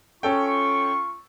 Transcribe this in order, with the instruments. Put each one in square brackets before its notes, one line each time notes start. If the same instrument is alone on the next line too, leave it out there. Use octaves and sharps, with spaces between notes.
[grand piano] C#4 A4 G5 [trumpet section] F4 C#6